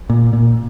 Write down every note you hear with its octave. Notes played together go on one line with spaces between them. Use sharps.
A#2
A#2